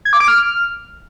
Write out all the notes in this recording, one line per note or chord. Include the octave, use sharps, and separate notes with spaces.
G#6
D6
D7
F6